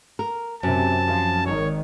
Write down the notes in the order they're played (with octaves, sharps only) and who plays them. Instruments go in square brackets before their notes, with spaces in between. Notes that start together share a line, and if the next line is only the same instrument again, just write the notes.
[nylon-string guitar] A#4
[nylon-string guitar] F#2 [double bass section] C3 [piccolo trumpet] A5
[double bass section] F3
[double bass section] G#1 D#3 [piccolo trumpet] C#5